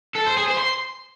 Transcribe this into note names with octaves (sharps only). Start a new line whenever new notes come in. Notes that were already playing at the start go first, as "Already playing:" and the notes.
A4
C5
G#4
C5
C6